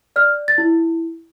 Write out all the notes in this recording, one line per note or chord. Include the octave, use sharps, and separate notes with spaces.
D5 F6
A6
E4